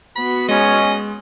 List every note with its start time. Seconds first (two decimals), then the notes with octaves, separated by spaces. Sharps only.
0.16 B3 F#4 B5
0.49 G#3 C#4 D#5